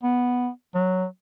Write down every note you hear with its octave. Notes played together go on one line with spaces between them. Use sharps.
B3
F#3